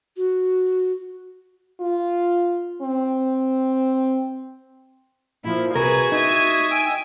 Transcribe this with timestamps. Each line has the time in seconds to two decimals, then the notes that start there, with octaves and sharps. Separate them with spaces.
0.17 F#4
1.81 F4
2.82 C4
5.44 A#2 F3 E4
5.76 C2 F#4 G#4 A#4 B4 G#6
6.12 D#4 E5 D#6
6.71 G5 G#5 E6